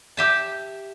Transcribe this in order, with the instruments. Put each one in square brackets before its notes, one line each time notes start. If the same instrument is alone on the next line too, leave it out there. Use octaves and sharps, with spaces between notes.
[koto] G4 E5 A5